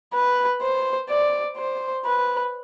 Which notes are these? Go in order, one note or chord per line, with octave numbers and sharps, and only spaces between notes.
B4
C5
D5
C5
B4